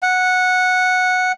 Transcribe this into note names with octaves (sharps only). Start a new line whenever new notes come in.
F#5